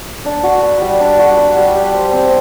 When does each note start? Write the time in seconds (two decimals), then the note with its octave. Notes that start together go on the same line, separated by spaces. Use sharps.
0.25 D4
0.43 F#4
0.63 B4
0.81 G3
1.00 D4
1.18 F#4
1.37 B4
1.56 G3
1.75 G4
1.94 C5
2.12 C4